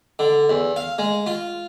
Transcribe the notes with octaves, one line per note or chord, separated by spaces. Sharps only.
D3
E2
F5
G#3
F4